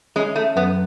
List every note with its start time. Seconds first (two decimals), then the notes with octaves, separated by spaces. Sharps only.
0.16 G#3 C#4
0.36 A3
0.56 F#2 B3